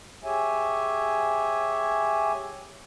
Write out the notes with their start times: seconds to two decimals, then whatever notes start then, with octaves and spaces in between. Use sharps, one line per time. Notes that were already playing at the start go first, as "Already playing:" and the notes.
0.24 G4 G#4 C#5 E5 G#5